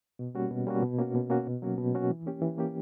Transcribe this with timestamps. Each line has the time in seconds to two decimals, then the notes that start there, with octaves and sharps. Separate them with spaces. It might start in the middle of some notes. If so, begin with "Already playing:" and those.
0.19 B2
0.35 G3 A#3 C#4 F#4
0.51 B2
0.67 G3 A#3 C#4 F#4
0.82 B2
0.99 A#3 C#4 F#4
1.15 B2
1.30 A#3 C#4 F#4
1.47 B2
1.62 F#3 A#3 C#4 F#4
1.78 B2
1.94 F#3 A#3 C#4 F#4
2.10 E3
2.26 A#3 C#4 G4
2.42 E3
2.58 A#3 C#4 G4